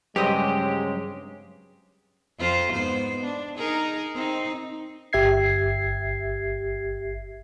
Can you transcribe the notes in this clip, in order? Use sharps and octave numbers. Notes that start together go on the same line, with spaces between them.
G2 C#3 F#3 G#3 C4 G4 D#5
F2 F4 C5
G#2 B3 C5
D4
D#4 G#4 A#4
C4 D#4
G1 G4 E5 G#6 C7